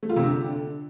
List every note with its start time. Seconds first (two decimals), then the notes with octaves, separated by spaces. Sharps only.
0.03 A3
0.09 F4
0.16 C3
0.23 D3